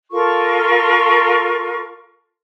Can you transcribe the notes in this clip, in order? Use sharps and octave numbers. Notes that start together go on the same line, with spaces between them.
F4 A4 A#4 C#6